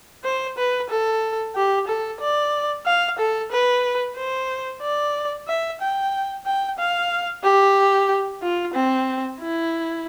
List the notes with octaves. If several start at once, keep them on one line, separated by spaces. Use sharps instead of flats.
C5
B4
A4
G4
A4
D5
F5
A4
B4
C5
D5
E5
G5
G5
F5
G4
F4
C4
E4